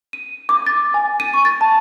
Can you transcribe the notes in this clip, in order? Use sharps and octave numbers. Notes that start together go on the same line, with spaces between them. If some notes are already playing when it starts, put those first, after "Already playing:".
D#7
D6
A6
G#5
D#7
C#6
A6
A5